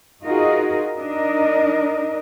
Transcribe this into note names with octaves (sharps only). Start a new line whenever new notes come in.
D#4 F4 F#4 G#4 A#4 D#5
D4 D#4 A#4 D#5